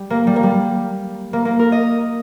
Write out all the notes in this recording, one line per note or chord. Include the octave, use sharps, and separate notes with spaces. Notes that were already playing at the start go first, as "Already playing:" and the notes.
Already playing: G3
A#3
G3
A#3
G3
A#3
A#3
A#4
D#5